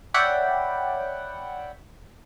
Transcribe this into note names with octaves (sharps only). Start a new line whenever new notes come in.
C#5 D5 E5 F#5 G5 B5